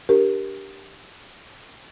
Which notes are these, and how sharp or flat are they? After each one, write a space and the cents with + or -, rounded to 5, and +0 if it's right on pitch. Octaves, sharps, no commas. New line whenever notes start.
D4 +0 G4 +0 A#4 +10